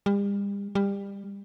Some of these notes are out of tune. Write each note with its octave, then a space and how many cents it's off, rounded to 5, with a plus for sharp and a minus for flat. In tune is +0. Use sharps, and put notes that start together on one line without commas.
G3 +40
G3 +25